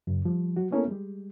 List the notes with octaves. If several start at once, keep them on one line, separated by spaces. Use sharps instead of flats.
F#2 C#3
F3 G3
F#3 F#4
A#3 B3 C#4 E4 A4 A#4
G3 G#3